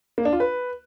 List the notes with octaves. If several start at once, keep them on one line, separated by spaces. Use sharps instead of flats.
A#3
D4
F4
B4